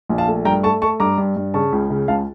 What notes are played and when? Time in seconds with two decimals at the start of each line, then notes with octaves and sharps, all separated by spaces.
0.09 A#1
0.18 F5 A5
0.27 A3
0.45 G2 G5 A#5
0.63 A3 A5 C#6
0.82 A3 A5 C#6
1.00 G2 A#5 D6
1.18 G2
1.36 G2
1.54 C#3 A5 C#6
1.72 C#2
1.90 C#3
2.08 C#2 F5 A5